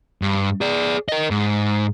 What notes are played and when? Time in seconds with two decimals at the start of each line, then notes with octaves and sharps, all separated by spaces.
0.22 G2
0.61 G#4 D5
1.09 A#4 D#5
1.31 G#2